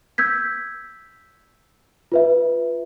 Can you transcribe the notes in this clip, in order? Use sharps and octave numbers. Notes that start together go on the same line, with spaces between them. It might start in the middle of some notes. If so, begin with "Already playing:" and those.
E6 G6 G#6 B6
F4 B4 E5